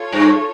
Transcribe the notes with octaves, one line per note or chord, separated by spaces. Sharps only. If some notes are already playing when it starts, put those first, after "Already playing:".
Already playing: F4 A4 C#5
G2